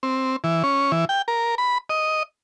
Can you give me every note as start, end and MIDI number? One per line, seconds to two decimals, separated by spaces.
0.03 0.36 60
0.44 0.63 52
0.64 0.92 61
0.92 1.05 52
1.09 1.22 79
1.28 1.55 70
1.58 1.78 83
1.90 2.23 75